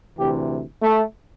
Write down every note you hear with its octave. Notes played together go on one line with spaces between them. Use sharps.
D2 C3 E3 G4
A3